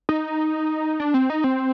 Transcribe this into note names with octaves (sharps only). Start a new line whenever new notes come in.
D#4
D4
C4
D#4
C4